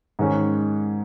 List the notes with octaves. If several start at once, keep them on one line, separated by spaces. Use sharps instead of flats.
G#2 D#3 G#3 C#4